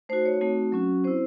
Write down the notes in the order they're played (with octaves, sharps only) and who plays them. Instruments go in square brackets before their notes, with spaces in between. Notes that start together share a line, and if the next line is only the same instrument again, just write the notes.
[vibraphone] A3 D#4 F#4 C5
C#5
A3 C4 D#4 F#4
F#3 C#4 F#4
C4 E4 C5